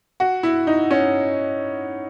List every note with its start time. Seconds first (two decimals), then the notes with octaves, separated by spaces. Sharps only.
0.20 F#4
0.43 E4
0.67 D#4
0.91 C#4